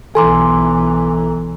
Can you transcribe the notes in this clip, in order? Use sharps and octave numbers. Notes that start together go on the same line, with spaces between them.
B1 E3 A4 G#5 A#5 C6 D6